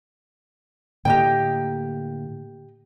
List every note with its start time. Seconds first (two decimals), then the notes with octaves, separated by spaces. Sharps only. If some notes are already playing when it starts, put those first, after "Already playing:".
1.05 A2 D3 A#3 G4 D#5 G5